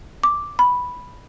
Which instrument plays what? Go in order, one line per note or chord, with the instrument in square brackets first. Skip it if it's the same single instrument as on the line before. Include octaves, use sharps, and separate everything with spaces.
[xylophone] D6
B5